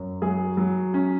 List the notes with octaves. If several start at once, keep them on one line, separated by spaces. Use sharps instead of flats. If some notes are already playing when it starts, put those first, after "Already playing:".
Already playing: F#2
F#3 G#4
F#3
C#4